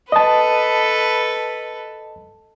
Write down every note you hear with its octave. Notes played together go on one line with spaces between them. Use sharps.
A4 B4 D#5 A5